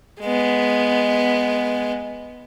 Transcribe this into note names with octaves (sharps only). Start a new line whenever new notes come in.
G#3 B3